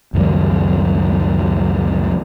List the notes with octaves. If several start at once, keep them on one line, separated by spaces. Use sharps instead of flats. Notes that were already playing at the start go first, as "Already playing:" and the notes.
C#2 F#2 D#3 G3